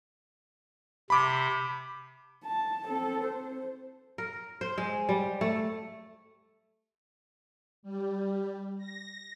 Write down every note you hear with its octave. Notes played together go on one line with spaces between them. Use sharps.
C3 B5 D6
A5
C4 A4
C5
A#4
C5
G#3
G3
A3
G3
A#6